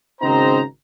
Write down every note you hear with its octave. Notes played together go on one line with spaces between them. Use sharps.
G#1 C#3 C4 D#4 C5 A#5